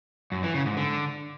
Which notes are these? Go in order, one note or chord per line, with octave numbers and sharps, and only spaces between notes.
F#2
E3
C#3
G#2
D3